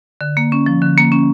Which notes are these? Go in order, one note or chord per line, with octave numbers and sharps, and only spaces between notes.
D3
A#3
C#4
F3
D3
A#3
C#4